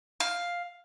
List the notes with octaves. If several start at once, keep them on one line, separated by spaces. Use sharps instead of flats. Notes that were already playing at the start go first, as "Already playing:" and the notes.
F5